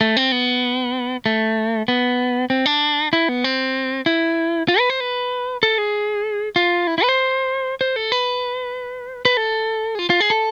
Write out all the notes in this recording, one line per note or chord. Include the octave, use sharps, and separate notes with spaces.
A3
C4
B3
A3
B3
C4
D4
E4
B3
C4
E4
F4
B4
C5
B4
A4
G#4
F4
E4
E4
B4
C5
C5
A4
B4
B4
A4
G#4
F4
F4
G#4
A4